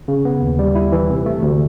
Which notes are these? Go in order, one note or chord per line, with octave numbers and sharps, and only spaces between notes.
C#3
B3
D#2
G3
E4
E3
C3
A3
D2